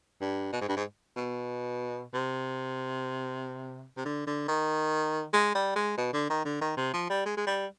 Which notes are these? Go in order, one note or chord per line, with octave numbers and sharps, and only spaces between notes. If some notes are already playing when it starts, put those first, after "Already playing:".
G2
B2
G#2
G2
G#2
B2
C3
C3
D3
D3
D#3
G#3
G3
G#3
B2
D3
D#3
D3
D#3
C3
F3
G3
G#3
G#3
G3